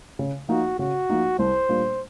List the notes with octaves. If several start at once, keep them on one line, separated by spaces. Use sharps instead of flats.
C#3
F3 A#3 D#4 F#4
C#3 F#4
F3 A#3 D#4
C2 C5
A#2 G3 A#3 D4